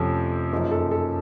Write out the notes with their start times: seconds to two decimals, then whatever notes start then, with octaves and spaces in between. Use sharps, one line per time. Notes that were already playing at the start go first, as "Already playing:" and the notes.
Already playing: F2 C3 F3 A3 C#4
0.52 F#2 C#3 F3 A#3 D#4
0.71 A4
0.91 A4